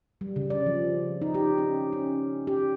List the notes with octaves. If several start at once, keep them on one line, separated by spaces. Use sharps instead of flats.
G3
C#3
D5
F3
D#4
G4
C#4
C#4
G4